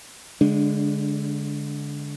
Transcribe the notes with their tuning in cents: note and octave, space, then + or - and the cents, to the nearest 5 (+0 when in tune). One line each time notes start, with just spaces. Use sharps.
D3 -25 G#3 +0 D4 +0